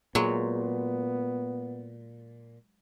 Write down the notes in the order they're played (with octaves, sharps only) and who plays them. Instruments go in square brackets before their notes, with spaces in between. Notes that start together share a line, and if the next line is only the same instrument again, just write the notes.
[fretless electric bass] A#2 [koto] F#3 G#3 [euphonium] B3